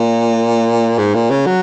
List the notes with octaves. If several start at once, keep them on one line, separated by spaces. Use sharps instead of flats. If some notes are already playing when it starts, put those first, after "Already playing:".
Already playing: A#2
G#2
A#2
C#3
F#3